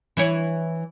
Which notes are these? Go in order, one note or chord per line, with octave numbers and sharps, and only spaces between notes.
E3 E4 C#5